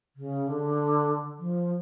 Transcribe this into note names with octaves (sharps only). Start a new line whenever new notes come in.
C#3
D3
F3